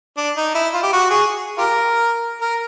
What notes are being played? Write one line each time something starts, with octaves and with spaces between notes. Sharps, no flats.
D4
D#4
E4
F4
G4
F#4
G#4
F4 G4 A#4
A#4